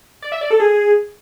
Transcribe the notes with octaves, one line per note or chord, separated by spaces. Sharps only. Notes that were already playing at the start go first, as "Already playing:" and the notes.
D5
E5
D5
A4
G#4